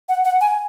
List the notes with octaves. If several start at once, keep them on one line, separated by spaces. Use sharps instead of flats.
F#5
F#5
G#5